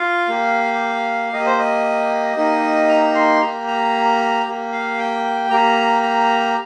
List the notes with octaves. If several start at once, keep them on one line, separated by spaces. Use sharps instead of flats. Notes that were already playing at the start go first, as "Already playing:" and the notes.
Already playing: F4 F5
A#3 G4
A#3 G4 D#5
C5
D#5
A#3 D#4 G4
A#5
C6
A#3 G4 A#5
A#5
A#3 G4
F5
G5
A#3 G4 A#5
A#5